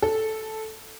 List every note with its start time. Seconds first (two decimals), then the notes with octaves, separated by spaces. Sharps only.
0.02 A4